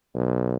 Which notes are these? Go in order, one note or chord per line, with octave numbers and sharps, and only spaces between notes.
B1